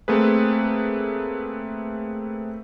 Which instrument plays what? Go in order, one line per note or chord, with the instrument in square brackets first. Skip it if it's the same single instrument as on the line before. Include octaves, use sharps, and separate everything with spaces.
[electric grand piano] A3 A#3 C4 G#4 B4